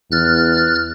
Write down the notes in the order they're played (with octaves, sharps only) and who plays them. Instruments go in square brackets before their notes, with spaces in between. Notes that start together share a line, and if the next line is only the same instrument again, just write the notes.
[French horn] E2 [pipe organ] F6 F#6 A6